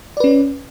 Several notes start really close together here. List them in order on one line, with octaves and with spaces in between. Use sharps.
D5 B4 C#4